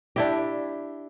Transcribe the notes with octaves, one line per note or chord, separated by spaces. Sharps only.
D4 E4 G4